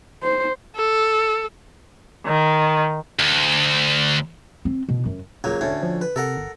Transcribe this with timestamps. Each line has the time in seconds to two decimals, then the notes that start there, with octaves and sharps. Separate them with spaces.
0.23 C5
0.76 A4
2.26 D#3
3.19 D2
4.65 C4
4.89 B2
5.05 F#2
5.44 D#1 C#2 F#3 A#3
5.61 E1 D2 A2 C#4
5.83 F3
6.01 B4
6.16 C3 A4 A#4 F#5
6.37 G1